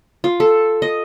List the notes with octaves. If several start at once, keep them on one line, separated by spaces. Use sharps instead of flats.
F4
A4
D#5